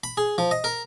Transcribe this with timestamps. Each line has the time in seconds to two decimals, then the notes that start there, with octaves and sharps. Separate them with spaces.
0.04 B5
0.17 G#4
0.38 F3
0.51 D#5
0.64 A#4